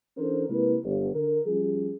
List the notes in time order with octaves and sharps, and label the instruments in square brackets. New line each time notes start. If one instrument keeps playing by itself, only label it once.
[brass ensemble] E3 C#4 D4 A4 A#4 C5
C3 G#3 A#3 E4 A#4 B4
G1
D3 A#4
F3 G3 C#4 G#4